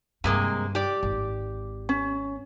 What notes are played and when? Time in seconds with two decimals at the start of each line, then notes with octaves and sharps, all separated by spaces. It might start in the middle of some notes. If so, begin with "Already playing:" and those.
0.24 G2 C3 G#3 A#3
0.75 G4 D5
1.03 G#1
1.89 C#4